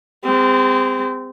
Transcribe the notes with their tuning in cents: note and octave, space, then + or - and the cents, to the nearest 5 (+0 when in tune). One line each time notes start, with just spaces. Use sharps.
G#3 -45 C4 -25